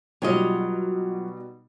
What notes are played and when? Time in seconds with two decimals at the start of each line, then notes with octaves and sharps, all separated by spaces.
0.22 B2 F#3 G3 D#4 F4 D#5